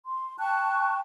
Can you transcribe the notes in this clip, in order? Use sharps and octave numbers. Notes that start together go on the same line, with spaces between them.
C6
G5 A5 C#6 F#6